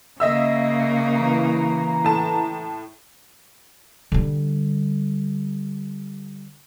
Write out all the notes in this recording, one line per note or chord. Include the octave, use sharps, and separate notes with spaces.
C#3 A#3 D#5 E5 E6
E3 A#5
A2 A5
D3 G3